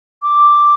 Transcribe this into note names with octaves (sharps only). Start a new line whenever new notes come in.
D6